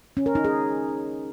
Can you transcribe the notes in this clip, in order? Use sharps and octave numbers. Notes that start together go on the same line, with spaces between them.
C#4
A#4
D#4
G#4